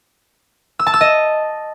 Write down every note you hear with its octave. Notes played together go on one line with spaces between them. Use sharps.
E6
A5
E6
D#5